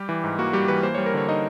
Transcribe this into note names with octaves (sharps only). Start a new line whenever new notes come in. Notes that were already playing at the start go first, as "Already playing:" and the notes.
Already playing: G3 G4
E3
G#2
A#3 F#4
G3 G4
E3 B4
A#3 C5
G3 C#5
A#4
D3 C#5
D#4 D#5